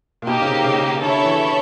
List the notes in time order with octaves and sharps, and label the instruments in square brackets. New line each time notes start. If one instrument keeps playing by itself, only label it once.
[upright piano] A#2
[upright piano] B2 [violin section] A#3 D#4 G4
[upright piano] C#3
C3
C#3
C#3
[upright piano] D3 [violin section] E4 A4 C#5 E5
[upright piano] E3